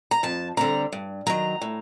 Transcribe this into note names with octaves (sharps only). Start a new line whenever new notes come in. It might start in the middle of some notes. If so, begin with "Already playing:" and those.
A#5
F2 A5
D3 G3 C4 A#5
G2
D#3 F#3 A#5
A2